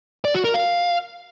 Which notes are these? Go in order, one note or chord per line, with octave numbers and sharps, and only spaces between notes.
D5
F#4
A#4
F5